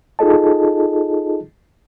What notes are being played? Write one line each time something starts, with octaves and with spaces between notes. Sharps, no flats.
D#4 F4 G#4 A4 D#5 A5